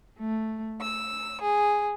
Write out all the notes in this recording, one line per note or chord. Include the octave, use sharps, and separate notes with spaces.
A3
E6
G#4